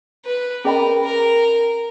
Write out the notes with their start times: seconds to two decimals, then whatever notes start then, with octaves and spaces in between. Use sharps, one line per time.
0.25 B4
0.64 C#4 G#4 A#4 D#5 G5 B5
1.03 A#4